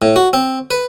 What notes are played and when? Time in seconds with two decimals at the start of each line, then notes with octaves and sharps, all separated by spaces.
0.02 A2
0.16 F#4
0.33 C4
0.71 B4